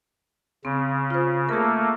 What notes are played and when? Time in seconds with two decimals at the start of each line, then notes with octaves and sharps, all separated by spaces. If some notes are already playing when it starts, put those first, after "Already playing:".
0.65 C#3 C4
1.10 F4 C5
1.49 A3 A#3 G#4 A#4